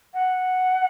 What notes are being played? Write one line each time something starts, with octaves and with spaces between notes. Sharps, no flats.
F#5